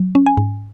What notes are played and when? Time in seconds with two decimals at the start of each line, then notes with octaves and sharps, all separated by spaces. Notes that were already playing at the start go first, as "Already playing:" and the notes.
Already playing: F#3
0.15 C#4
0.26 G#5
0.37 G#2